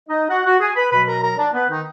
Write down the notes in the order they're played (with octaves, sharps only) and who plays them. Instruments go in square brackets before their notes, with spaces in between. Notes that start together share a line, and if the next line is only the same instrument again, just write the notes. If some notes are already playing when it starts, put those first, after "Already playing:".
[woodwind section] D#4 D#5
F#4 F#5
F#4 F#5
G#4 G#5
B4 B5
B2 F#3 B4 B5
A#4 A#5
A#4 A#5
D4 D5
B3 B4
D#3 D#4